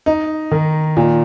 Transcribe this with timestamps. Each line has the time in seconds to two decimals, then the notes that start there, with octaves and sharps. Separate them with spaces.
0.06 D#4
0.51 D#3
0.97 A#2